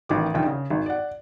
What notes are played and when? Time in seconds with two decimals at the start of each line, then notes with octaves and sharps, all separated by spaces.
0.09 A1 D#3 D6
0.34 A#1 D#2 G5
0.46 C#3
0.70 G#1
0.86 D5 F#5